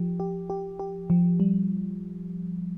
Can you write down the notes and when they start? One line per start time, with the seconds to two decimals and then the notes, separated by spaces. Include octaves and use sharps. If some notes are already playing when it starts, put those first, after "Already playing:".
Already playing: F3 G4
0.20 G4
0.50 G4
0.80 G4
1.10 F3
1.40 G3